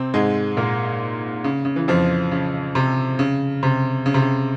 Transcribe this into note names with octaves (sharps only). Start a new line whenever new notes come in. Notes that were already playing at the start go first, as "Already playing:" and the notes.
Already playing: C3 C4
G#2 G#3
A#2 A#3
C#3
C#3
E3
F2 F3
C#3
C3
C#3
C3
C#3
C3
C#3